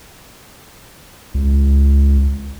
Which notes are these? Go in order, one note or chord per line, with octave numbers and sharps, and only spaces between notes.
C#2